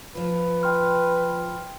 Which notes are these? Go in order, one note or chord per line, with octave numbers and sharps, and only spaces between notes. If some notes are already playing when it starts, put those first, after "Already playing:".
F3 F4 B4
G5 C6 F6